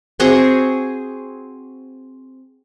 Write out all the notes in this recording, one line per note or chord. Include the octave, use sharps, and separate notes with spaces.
C4 F#4 G#4 C5